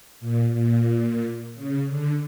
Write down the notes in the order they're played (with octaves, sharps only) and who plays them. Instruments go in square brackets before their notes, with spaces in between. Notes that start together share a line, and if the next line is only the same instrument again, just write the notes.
[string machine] A#2
A#2
C#3
D3